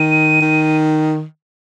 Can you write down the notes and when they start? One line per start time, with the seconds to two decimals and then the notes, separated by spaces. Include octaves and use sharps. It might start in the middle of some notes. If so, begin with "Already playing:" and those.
Already playing: D#3 D#7
0.41 D#3